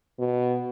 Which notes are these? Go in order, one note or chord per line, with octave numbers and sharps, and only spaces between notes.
B2